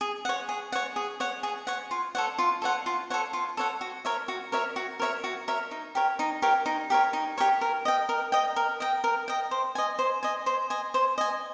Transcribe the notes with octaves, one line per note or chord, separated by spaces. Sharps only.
G#4
C#5 F#5
G#4
C#5 F#5
G#4
C#5 F#5
G#4
C#5 F#5
F4
A4 C#5 F#5
F4
A4 C#5 F#5
F4
A4 C#5 F#5
F4
A4 C#5 F#5
F#4
A#4 C#5 E5
F#4
A#4 C#5 E5
F#4
A#4 C#5 E5
F#4
A#4 C#5 E5
D#4
G4 A#4 C#5
D#4
G4 A#4 C#5
D#4
G4 A#4 C#5
D#4
G4 A#4 C#5
A#4
D#5 G5
A#4
D#5 G5
A#4
D#5 G5
A#4
D#5 G5
C5
D#5 G#5
C5
D#5 G#5
C5
D#5 G#5
C5
D#5 G#5